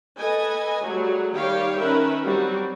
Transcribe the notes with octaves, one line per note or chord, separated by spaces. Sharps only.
A4 B4 D#5 G#5
F#3 G3 A3 G#4
D#3 G3 G4 C#5 F5 G5
D#3 C#4 A#4 B4 E5
F#3 G3 C4 F#4